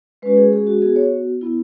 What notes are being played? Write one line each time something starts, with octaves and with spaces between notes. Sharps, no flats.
G#3 C#4 F#4 B4
G#4
G#4
F#4
B3 F#4 G#4
C#5
B3 E4